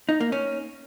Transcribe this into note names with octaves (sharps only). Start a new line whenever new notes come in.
D#4
A#3
C#4